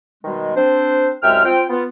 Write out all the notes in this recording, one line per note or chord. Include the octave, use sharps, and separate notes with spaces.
B2 D#3 G3 G#3
C4 D4 C5
C2 F#2 G#3 E5 G5 F6
C4 F4 G5
B3 F4